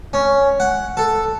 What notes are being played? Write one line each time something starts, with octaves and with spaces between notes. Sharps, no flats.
C#4
F#5
A4